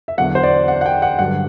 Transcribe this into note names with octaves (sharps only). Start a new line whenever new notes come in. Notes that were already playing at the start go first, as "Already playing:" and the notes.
E5
E2 D3 F#3 F#5
C5
D5
F#5
F#5
G5
F#5
G2 D3 F#3 F#5